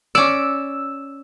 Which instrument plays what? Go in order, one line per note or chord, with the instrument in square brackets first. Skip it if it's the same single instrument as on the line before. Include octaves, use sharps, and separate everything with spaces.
[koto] C#4 D5 [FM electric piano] E6